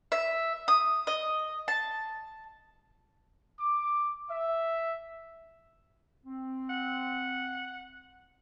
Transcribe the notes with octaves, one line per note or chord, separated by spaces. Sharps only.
E5
D#6
D#5
A5
D6
E5
C4
F#5